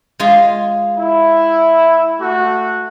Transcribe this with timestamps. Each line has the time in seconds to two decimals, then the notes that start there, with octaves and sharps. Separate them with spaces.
0.20 G#3 F4 G#4
0.97 E4
2.19 A3 F#4